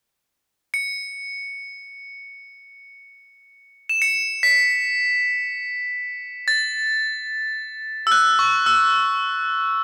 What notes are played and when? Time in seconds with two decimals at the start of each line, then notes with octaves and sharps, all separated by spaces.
0.74 C#7
3.89 E7
4.02 C#7
4.43 B6
6.48 A6
8.07 E6
8.12 F#6
8.39 C#6
8.66 E6